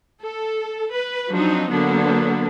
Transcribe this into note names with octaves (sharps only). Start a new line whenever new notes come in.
A4
B4
F3 F#3 C4 D4 D#4
D3 F#3 A#3 B3 D4